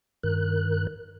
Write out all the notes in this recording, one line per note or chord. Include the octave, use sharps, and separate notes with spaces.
G2 D#3 A#4 F#6